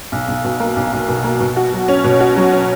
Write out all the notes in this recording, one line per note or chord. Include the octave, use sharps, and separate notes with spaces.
B1
B1
B2
A#3
B1
B1
B2
A#3
B2
F#4
F#3
C#4
B2
F#4
F#3
C#4